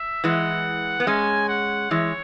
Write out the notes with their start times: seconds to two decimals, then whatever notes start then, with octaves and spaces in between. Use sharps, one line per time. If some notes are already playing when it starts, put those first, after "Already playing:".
Already playing: E5
0.24 E3 G#3 F#5
1.00 B3
1.07 G#3 C#4 G#5
1.49 F#5
1.91 E3 G#3 C#5